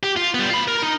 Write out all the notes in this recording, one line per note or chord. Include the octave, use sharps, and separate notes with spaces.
G4
F4
G3 B3
F4 B5
A#4
D#4